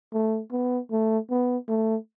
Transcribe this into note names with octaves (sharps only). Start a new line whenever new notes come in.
A3
B3
A3
B3
A3